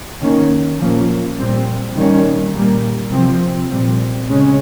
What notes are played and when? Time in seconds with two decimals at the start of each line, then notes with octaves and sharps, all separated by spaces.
0.21 D#3 A#3 C#4
0.79 A#2 F3 A#3 C#4
1.38 A#2 G3 C4
1.96 D#3 G3 A#3 C#4
2.53 A#2 G3 A#3
3.12 C3 F3 C4
3.70 A#2 G3 C4
4.28 C#3 G#3 C#4